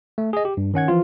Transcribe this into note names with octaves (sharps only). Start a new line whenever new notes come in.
A3
G#4 D#5
G4
G2
D#3 C#4 F#5 G#6
E3 F3 F4